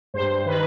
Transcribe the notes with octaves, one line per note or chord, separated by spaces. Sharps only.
G2 C5
D#3 B4